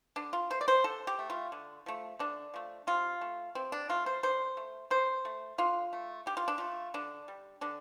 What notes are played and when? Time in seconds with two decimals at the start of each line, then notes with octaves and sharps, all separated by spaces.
0.16 D3 D4
0.33 F4
0.50 A3 C5
0.61 D5
0.68 C5
0.84 D3 A4
1.07 G4
1.19 A3
1.30 F4
1.52 D3
1.86 F3 A3
2.19 D3 D4
2.54 F3 A3
2.87 C3 F4
3.21 A3
3.55 C3 C4
3.72 D4
3.89 A3 F4
4.06 C5
4.23 D3 C5
4.57 A3
4.90 D3 C5
5.25 A3
5.58 D3 F4
5.93 A3
6.26 D3 G4
6.37 F4
6.48 D4
6.58 A3 F4
6.94 D3 D4
7.28 G3
7.61 D3 D4